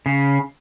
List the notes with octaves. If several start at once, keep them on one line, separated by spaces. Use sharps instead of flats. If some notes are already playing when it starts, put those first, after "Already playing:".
C#3